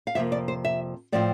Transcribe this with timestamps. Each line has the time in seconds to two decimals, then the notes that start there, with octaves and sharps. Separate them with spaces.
0.07 F5
0.15 F2 C3 F3 A#3 E5
0.32 D5
0.48 C5
0.65 E5
1.12 A2 F3 C4 D5